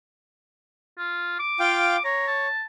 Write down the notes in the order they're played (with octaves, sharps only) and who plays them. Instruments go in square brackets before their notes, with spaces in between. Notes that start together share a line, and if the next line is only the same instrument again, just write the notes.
[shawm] F4
D6
[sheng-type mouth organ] F4 F5 G5
[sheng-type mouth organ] C#5 [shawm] A#5
[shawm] A5